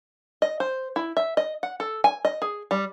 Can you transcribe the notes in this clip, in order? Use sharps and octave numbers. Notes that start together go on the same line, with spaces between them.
D#5
C5
E4
E5
D#5
F#5
A4
G#5
D#5
G#4
G3